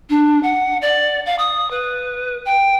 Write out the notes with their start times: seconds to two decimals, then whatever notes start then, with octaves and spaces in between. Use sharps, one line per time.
0.10 D4
0.43 F#5
0.82 D5
1.26 F5
1.39 D#6
1.71 B4
2.45 G5